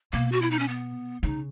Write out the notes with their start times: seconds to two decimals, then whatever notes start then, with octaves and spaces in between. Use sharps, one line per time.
0.13 B2 A#3
0.32 F#4
0.42 E4
0.51 D#4
0.59 C#4
0.68 B3
1.23 C#3 D#4